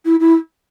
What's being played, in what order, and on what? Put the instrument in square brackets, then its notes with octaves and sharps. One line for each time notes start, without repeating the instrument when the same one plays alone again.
[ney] E4
E4